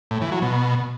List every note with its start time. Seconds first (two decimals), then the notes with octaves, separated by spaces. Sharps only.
0.11 A2
0.21 E3
0.32 F#3
0.42 B2